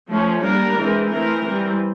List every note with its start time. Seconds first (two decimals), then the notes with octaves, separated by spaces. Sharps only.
0.08 F3 A3 C#4
0.41 G3 A#3 D4 A#4
0.75 E3 G#3 C4
1.08 E3 A3 C4 A#4
1.42 E3 G3 C4